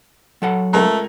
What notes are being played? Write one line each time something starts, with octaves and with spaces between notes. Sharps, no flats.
F#3 A4 F#5
C#2 A3 A#4 A#5